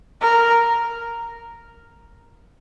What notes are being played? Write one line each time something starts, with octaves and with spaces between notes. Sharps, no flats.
A#4